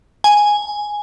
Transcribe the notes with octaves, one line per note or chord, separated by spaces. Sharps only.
G#5